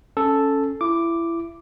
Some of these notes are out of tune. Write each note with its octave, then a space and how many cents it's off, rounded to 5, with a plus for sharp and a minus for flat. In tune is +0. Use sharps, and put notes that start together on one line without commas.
C#4 +0 A4 +0
E4 +25 D6 +0